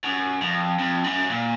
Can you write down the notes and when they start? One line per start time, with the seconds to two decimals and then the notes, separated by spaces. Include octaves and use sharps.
0.04 F#2
0.42 F2
0.79 F2
1.04 F#2
1.30 A#2